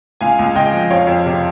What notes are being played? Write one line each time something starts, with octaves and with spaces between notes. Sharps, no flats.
C#2 F5 G#5
C#2
C#2 D#5 G5
F3
F2 C#5 F5
F2
C3